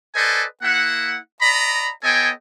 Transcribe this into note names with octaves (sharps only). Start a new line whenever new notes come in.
A4 B4 C5 D5 D#5 G#5
A#3 E4 E5 F#5
D5 D#5 A#5 B5
B3 A4 C#5 D#5 G5 G#5